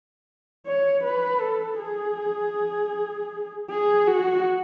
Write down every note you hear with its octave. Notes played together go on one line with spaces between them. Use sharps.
C#5
B4
A4
G#4
G#4
F#4